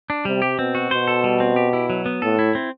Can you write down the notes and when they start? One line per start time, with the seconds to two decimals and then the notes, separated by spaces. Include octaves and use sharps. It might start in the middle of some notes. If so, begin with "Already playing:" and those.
0.10 D4
0.25 C3 G3
0.42 G4
0.59 B2 C4
0.75 F#4
0.91 B2 C5
1.08 A4
1.24 G3
1.40 C4
1.56 G4
1.73 E4
1.90 F#3
2.06 B3
2.22 A2 A4
2.39 E4
2.55 C4